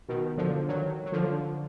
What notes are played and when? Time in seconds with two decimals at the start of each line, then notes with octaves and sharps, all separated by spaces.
0.09 B2 D#3
0.38 D3 F3
0.68 D#3 F#3
1.05 F#3
1.12 D3 F3